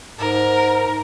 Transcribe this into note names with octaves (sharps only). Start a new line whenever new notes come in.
G#2 A#4